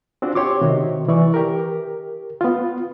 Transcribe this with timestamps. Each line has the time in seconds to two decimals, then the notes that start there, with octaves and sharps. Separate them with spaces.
0.22 C4 D4 F4 F#4
0.35 G4 C#5 C6 D6
0.61 C3 D#3 F#4
1.08 E3 D5 C#6
1.34 G4 A#4
2.41 B3 F4